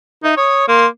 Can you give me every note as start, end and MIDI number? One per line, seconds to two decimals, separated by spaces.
0.24 0.34 63
0.24 0.37 76
0.37 0.64 73
0.37 0.67 87
0.68 0.86 58
0.68 0.87 84